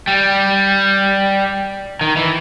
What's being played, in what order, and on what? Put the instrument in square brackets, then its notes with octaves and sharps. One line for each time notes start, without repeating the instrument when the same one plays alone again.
[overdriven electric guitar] G3
D#3
E3